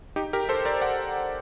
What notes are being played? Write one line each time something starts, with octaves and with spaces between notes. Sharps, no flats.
D#4 G4
G4 A#4
A4 C5
A#4 D5
D5 F#5